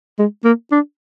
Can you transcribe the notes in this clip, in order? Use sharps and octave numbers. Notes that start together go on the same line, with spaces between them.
G#3
A#3
D4